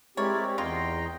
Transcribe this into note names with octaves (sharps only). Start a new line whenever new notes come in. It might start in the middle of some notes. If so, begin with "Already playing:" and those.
G#3 C4 E4 G4 A#4 C#5 D5
E2 F4 D#5 G5 A#5 C6